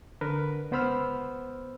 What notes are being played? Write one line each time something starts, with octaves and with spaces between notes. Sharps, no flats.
D3 A#4 B4
C#2 B3 C5 B5 E6 F6